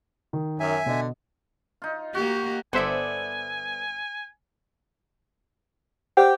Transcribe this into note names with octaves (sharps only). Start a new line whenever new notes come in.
D#3
F#2 E5 G#5
B2 D3 D#5
D#4 F4
A#3 F#4 G4
G1 B3 A4 C5 D5 E5 G#5
G4 C5 F#5 G5